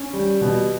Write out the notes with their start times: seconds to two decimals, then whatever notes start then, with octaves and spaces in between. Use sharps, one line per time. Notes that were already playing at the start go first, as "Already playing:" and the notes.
Already playing: C#4
0.13 G3
0.41 B2